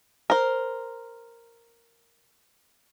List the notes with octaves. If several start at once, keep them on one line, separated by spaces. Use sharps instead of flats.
A#4 C5